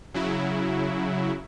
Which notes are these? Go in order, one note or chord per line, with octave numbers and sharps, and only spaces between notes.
C#3 F#3 E4